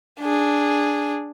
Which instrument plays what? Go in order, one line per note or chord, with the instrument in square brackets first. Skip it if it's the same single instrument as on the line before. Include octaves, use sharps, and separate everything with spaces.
[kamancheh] D4 G#4